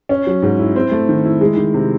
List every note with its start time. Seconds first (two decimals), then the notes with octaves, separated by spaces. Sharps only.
0.09 C#4
0.27 F#3
0.42 G#2
0.59 E4
0.76 C4
0.91 A3
1.09 D#3
1.25 E4
1.41 G#3
1.57 D#3
1.74 C3